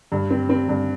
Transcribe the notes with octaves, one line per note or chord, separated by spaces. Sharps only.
G2
C4
C4
G2